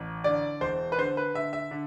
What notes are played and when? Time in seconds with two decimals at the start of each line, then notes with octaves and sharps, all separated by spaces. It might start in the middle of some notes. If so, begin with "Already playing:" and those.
Already playing: A1
0.24 D3 D5
0.61 E1 C5
0.92 B4
0.98 D3 C5
1.17 B4
1.34 D3 E5
1.53 E5
1.71 D3